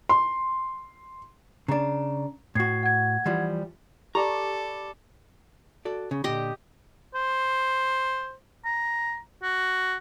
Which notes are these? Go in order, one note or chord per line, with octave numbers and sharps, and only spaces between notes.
C6
C#3 D4 A#5
A2 F#4 G#6 C7
F#5 G#6
E3 F3 G3
G4 A4 B4 D5 A#5 C#6
F#4 A4 D5
C#3
A#2 D3 G4 D#5
C5
A#5
F#4